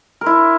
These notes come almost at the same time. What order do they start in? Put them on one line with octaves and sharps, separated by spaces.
A#4 C5 E4